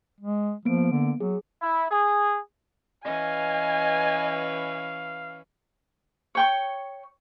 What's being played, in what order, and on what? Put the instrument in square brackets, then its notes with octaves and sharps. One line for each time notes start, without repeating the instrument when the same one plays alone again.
[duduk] G#3
[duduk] F3 [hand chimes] A#3 B3 D7
[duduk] D3
[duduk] F#3 [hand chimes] G#4
[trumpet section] E4
G#4
[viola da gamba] E3 C#4 B4 [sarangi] D#5 [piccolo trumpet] F5 [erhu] G#5
[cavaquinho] C#5 G5 C#6